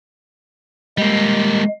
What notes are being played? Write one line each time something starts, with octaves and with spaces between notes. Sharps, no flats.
G3 G#3 A#3